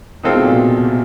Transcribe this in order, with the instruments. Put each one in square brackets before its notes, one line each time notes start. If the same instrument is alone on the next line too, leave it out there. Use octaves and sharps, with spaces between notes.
[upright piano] C3 [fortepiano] D#3 G#3 C4 F4 A4
[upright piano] B2
A#2
B2
B2
C3